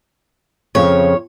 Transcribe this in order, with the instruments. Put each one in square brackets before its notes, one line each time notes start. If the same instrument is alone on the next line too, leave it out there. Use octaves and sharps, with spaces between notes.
[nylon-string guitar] F2 C#3 F3 [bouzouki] C#5